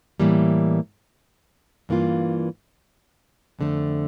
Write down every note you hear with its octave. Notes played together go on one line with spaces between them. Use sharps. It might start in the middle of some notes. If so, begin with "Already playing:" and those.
A2 E3 G3 A#3
G2 E3 A#3 F4
F2 D3 A3